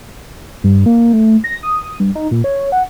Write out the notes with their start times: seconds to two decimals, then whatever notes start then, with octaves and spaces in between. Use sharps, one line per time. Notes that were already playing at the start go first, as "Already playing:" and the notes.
0.64 G2
0.86 A#3
1.13 A3
1.44 A#6
1.63 D#6
2.00 G2
2.15 D#4
2.31 A#2
2.44 C#5
2.72 F#5